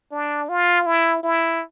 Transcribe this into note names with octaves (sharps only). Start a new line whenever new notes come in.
D4
F4
E4
E4